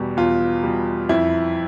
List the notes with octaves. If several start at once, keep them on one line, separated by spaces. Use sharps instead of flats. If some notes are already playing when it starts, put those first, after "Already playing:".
Already playing: E2 B2 G3
E2 F4
B2 G3
F2 E4